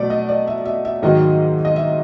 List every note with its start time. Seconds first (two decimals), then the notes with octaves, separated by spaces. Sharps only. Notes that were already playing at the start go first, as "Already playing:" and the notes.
Already playing: B2 F#3 A3 D5
0.10 D#5
0.29 D5
0.47 E5
0.65 E5
0.85 E5
1.02 G#2 D#3 F#3 A#3 D#5
1.65 D#5
1.76 E5